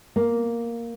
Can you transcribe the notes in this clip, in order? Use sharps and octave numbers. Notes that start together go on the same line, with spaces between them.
A#3